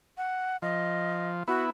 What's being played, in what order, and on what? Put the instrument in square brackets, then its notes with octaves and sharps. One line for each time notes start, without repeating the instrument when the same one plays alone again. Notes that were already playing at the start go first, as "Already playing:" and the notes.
[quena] F#5
[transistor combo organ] F3 [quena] D#5
[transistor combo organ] B3 E4 [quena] F#4